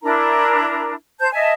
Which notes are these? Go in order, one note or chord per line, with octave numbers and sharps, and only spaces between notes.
D4 E4 A#4 A#5
C5 A5 G6
D#5 E5 G#5 A5